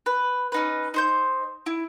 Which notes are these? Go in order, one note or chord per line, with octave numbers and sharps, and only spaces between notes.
B4
C#4 D#4 B4
D#4 C5 G6
E4